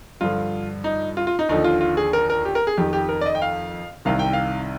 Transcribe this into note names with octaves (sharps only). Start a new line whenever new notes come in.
G2 D3 F3 F4
D#4
F4
F4
D#4
D#2 D3 F3 D#4
F4
F4
G#4
A#4
A#4
G4
A#4
G#4
F2 D#3 G4
G4
A#4
D5
D#5
G5
F5
C2 C3 D#3 F5
G5
F5